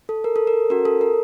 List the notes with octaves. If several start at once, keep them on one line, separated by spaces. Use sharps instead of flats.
A4
A#4
A4
A#4
C#4 F#4 A4 A#4
A4
A#4